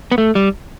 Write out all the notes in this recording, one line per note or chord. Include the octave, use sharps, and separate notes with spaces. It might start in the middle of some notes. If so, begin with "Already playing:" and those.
B3
A3
G3